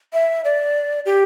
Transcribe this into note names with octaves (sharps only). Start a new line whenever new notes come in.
E5
D5
G4